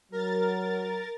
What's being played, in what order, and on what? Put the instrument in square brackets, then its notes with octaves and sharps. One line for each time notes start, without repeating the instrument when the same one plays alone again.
[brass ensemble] F#3 [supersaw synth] A#4 A6